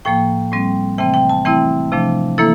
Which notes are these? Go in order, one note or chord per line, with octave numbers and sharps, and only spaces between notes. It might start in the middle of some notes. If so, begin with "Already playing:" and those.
A2 F3 A#3 G5
A2 G3 C4
C3 E3 A3 C4 G5
G5
A5
E3 A3 C4 E4 G5
C3 F3 A3 D4
E3 A#3 E4 A4